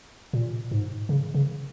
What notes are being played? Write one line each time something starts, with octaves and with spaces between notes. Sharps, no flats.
A#2
G#2
C#3
C#3